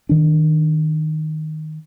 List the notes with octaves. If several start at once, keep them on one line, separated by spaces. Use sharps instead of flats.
D#3 D4